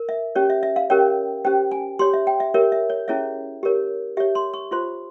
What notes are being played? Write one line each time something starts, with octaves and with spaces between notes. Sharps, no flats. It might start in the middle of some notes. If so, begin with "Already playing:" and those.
Already playing: A#4
E5
C#4 G4 C#5
E5
E5
F5
C#4 G4 A#4 C#5 G5
C#4 G4 C5 G5
G#5
G4 C#5 C6
E5
G5
E5
G4 A#4 C#5 E5
E5
C#5
C#4 E4 G#4 C#5 E5
G4 A#4 C#5
G4 C#5 E5
C6
C#6
F4 C5 C6